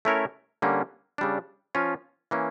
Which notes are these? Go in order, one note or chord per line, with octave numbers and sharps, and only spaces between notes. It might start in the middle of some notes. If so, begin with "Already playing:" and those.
A3 C#4 E4 A#4 C#5
D3 G3 A#3 C#4
C#3 G3 D4
F3 C#4 F4
E3 A#3 C#4